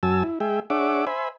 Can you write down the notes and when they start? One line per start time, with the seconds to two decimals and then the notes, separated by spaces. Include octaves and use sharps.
0.03 F#2 F#3 G#5 A5 E6
0.23 E4
0.40 G#3 G#4 E5 G5
0.70 D4 G#4 C#5 E5 F#5 D6
1.07 C5 E5 G#5 B5